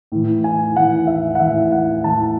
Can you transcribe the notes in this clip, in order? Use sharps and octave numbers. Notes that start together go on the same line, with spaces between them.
A2 E3
G#5
A2 E3 F#5
E5
F#5
A2 E3 E5
F#5
A2 E3 A5